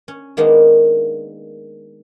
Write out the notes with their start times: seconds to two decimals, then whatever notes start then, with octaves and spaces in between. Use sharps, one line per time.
0.08 C#4
0.37 D#3 G#3 A#3 B3 D4 D#4